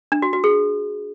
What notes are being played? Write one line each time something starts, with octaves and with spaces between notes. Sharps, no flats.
D4
F#4
F#4
G#4